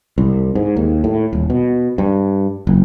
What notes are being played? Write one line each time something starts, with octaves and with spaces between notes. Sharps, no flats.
C2
G#2
D#2
A2
D#1
B2
G2
F#1